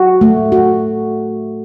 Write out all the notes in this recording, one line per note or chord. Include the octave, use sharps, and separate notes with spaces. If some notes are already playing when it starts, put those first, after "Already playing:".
Already playing: F#4
A3
F#4